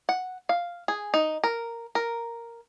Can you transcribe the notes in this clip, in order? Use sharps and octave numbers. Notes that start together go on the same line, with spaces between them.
F#5
F5
G#4
D#4
A#4
A#4